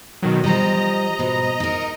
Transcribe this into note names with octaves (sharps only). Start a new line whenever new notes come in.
B2 D#3 F#3
F3 G3 D#5 A#5
G#2 B2
D#4 A#4